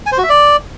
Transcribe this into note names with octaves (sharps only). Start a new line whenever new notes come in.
G#5
C5
F#4
E5
D5